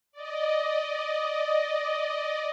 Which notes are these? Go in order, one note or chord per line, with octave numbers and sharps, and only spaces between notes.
D5 D#5